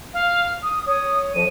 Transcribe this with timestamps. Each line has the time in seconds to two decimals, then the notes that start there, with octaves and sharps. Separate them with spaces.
0.14 F5
0.63 D#6
0.87 C#5 D#6
1.34 F2 F3 D#7